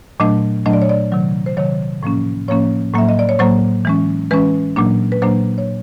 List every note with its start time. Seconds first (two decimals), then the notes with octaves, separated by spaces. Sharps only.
0.20 A#2 F#3 A3 D4 D#5
0.66 A#2 F#3 A3 D4 D#5
0.73 D5
0.82 C#5
0.89 D5
1.12 C3 D#3 F#3
1.46 C5
1.57 C3 D#3 F#3 C#5
2.03 A2 F3 A#3 C#4
2.48 A2 F3 A#3 C#4 C#5
2.94 A2 F#3 A#3 E5
3.09 D#5
3.19 D5
3.29 C#5
3.39 A2 F#3 A#3 C5
3.85 E3 G#3 C#4
4.31 E3 G#3 C#4 B4
4.76 A#2 F#3 A#3 D4
5.12 B4
5.22 A#2 F#3 A#3 D4 C5
5.58 C#5